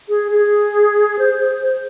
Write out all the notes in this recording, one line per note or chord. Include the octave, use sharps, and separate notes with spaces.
G#4
G#4
C5
C5
C5